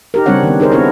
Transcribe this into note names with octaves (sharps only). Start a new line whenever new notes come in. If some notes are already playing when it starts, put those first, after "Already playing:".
D#4 G4 A#4
C#3 G3 C4 D4 C#5 F#5
D#3 B3
D#4 G#4 A#4 C5 C#5
B3 C4 D4 E4 A#4 C#5